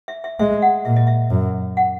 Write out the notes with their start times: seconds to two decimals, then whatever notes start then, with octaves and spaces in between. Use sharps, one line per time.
0.08 E5
0.24 E5
0.39 G#3 E5
0.62 F#5
0.85 A#2 E5
0.96 D#5
1.07 E5
1.31 F#2
1.77 F#5